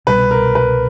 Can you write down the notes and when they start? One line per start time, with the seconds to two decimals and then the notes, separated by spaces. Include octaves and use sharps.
0.07 C2 B2 G3 B4
0.31 A#4
0.55 B4